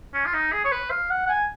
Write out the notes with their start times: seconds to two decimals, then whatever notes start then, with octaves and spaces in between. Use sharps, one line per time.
0.14 C#4
0.25 F4
0.33 D#4
0.52 G#4
0.64 C#5
0.72 B4
0.90 F5
1.10 F#5
1.26 F#5
1.29 G#5